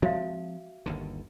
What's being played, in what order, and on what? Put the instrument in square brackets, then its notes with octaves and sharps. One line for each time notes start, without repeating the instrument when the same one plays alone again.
[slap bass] F3 G#3 C4 [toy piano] F#4 E5 F5
[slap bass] G1 D#2 D3